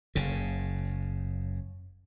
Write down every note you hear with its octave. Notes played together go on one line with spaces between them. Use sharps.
F#1 C#3